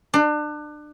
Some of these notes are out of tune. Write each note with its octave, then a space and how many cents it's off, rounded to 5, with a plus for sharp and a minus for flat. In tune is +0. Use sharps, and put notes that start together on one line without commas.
D4 +30